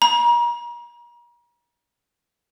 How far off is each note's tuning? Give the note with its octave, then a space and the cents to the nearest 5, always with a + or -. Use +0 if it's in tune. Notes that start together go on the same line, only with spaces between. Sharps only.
A#5 +40